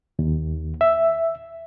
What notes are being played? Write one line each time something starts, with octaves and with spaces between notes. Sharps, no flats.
D#2
E5